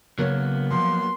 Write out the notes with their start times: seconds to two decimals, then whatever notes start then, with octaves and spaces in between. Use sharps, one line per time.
0.19 C#3 F#3 A#3 B3 A#4 C#5
0.71 F3 C6